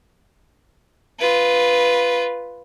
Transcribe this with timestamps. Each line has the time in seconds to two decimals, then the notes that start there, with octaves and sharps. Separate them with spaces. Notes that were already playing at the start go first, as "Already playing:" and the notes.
1.20 F4 B4